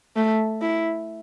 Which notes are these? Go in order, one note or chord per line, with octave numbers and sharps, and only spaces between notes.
A3
E4